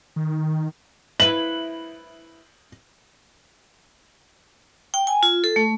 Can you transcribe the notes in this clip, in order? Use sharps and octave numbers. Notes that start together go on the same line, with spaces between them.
D#3
E4 B4 F#7
G5
G#5
F4
A4
A3